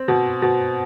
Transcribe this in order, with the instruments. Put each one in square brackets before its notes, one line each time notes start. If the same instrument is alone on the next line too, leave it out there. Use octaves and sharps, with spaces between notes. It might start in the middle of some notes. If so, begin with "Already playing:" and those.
Already playing: [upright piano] C4
B2
B2